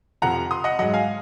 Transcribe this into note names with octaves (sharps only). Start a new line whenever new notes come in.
F2 C3 F3 F#5 A#5
C6 D#6
D#5 F#5
G#2 F#3 D#5 F#5
F5 G#5